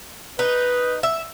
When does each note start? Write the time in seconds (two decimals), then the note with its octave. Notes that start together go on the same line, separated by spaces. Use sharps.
0.39 D#4 B4
1.03 E5